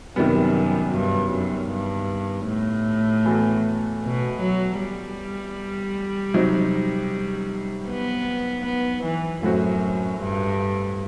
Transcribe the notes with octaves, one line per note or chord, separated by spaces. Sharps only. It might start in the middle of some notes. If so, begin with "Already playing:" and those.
F#2 C3 D#3 G3 B3
G2
F#2
G2
A2
E3 B3 F#4 A4
B2
F#3
G3
C3 F#3 C4 D#4
B3
B3
E3
F#2 A2 F#3 C4 F#4
G2